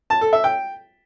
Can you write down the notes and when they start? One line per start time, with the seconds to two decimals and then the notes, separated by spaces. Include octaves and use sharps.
0.10 A5
0.21 A4
0.33 E5
0.44 G5